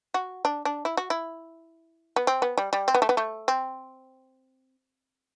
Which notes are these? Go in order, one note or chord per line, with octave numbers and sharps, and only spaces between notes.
F#4
D4
D4
E4
F#4
E4
B3
C4
B3
G3
G3
C4
B3
A3
B3
A3
C4